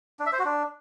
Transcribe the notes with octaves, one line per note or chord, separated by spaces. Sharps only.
D4
E5
C5
F#4
D4